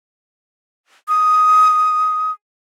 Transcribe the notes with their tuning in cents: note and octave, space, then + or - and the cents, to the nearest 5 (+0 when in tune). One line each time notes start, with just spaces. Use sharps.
D#6 +10